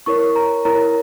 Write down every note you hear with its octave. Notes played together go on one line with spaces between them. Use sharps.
E4 A#4 C#5 C#6
A#5
E4 A#4 C#5 A#5